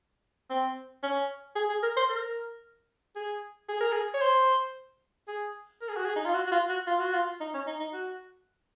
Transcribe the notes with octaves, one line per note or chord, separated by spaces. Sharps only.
C4
C#4
G#4
G#4
A#4
C5
A#4
G#4
G#4
A#4
G#4
C#5
C5
G#4
A#4
G#4
F#4
G#4
D#4
F4
F#4
F#4
F4
F#4
F4
F#4
F4
D#4
C#4
D#4
D#4
F#4